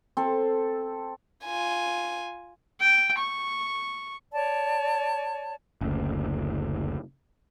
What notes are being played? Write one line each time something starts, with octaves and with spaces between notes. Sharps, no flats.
C4 A4
F4 G#5
G5
C#6
C#5 D5 A5
F#1 D2